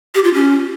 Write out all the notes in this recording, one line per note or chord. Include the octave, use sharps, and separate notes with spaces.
G4
F4
C#4